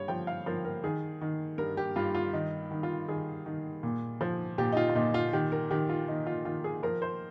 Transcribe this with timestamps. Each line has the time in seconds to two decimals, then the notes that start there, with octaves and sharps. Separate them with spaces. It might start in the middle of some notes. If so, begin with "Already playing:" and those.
Already playing: G2 C#5
0.08 F3 G5
0.27 F5
0.46 F3 A#4
0.65 A#4
0.83 D#3 G#4
1.21 D#3
1.58 G2 A#4
1.77 G4
1.96 G2 F4
2.15 F4
2.33 D#3 D#4
2.71 D#3
2.83 F4
3.08 D#3 G#4
3.46 D#3
3.83 A#2
4.21 F3
4.58 A#2 G4
4.72 D#4
4.77 F4
4.90 F4
4.95 A#2 D#4
5.14 F4
5.33 D#3 G4
5.52 A#4
5.71 D#3 G4
5.89 F4
6.08 D#3 D#4
6.27 F4
6.45 D#3 F4
6.64 G#4
6.83 F3 A#4
7.02 C5